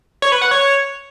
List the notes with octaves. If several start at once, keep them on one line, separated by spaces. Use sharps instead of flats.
C#5
B4
F#5
C#5